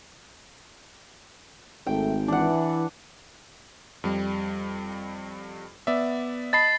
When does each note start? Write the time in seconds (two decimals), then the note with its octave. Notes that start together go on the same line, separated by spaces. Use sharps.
1.87 G#1 A3 G5
2.28 E3 D4 F#5
4.04 F2 G3
5.87 B3 D5 E5
6.53 D#5 A5 B5 A6 C7